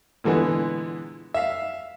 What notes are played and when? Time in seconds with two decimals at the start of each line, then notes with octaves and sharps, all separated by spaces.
0.24 A#2 D3 E3 G#3 B3
1.34 E5 F5